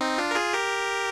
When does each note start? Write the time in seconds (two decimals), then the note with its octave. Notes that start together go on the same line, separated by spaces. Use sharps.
0.01 C4 D#4
0.18 D4 F4
0.31 A#4
0.35 F4 G#4
0.53 G4 A#4